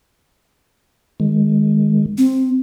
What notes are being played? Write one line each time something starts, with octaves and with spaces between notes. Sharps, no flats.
D#3 G#3
C4